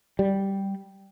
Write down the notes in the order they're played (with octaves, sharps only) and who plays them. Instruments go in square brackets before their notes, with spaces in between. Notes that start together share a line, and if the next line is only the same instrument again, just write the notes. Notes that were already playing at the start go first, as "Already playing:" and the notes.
[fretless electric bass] G3